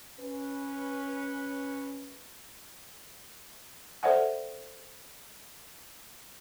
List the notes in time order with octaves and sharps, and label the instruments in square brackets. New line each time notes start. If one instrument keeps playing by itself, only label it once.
[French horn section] C#4 B4
[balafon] A4 C5 D5 E5 F#5 G#5